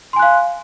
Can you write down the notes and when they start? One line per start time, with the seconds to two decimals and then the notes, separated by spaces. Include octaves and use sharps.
0.13 C6
0.16 G#5
0.19 F#6
0.22 F5